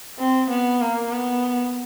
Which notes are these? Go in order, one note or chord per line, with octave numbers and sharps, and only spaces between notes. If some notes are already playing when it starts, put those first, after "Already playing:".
C4
B3
A#3
B3